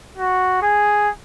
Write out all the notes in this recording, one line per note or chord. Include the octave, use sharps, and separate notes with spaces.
F#4
G#4